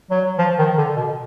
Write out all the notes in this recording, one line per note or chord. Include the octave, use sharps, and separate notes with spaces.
F#3
F3
D#3
D3
B2